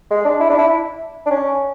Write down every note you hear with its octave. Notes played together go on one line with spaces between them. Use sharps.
G#3
D4
E4
D4
E4
D4
C#4